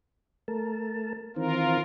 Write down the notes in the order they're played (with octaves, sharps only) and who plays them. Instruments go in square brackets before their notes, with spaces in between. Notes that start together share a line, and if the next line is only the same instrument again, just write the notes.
[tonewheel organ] A3 A#4 A5
[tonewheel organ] D#3 E3 C4 [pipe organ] F4 A#4